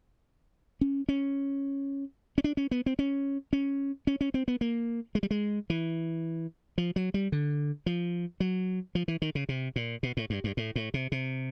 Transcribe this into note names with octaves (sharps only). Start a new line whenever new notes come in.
C#4
C#4
C#4
D4
C#4
B3
C4
C#4
C#4
C#4
C#4
C4
B3
A#3
G#3
G3
G#3
E3
F3
F#3
G3
D3
F3
F#3
F3
E3
D#3
C#3
C3
A#2
B2
A2
G2
G2
A2
A2
C3
C3